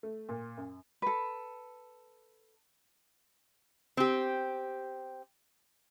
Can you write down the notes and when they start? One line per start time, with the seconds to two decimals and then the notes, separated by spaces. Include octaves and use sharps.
0.03 A3
0.29 A#2
0.57 F#2
1.02 A4 B4
3.97 C4 G4